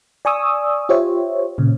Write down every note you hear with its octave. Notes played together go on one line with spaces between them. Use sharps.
D5 G#5 C#6 D#6 E6
F4 G4 C5 C#5 E5
A#2 C#3